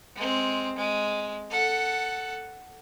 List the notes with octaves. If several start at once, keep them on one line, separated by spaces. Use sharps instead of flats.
G#3 C4
G#3
A4 F#5